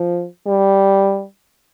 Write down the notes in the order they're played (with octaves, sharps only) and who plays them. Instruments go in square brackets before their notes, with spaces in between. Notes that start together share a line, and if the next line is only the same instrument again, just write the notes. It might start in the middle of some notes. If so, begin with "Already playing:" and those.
Already playing: [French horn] F3
G3